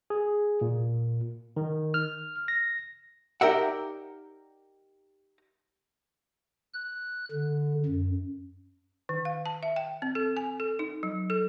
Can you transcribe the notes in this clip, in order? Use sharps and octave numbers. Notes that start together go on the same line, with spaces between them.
G#4
A#2
D#3
F6
A#6
D#4 G4 A#4 D5 E5 F#5
F#6
D3
F#2
D#3
F5
A5
E5
G5
C4
A4
G#5
A4
D#4
F#3
A4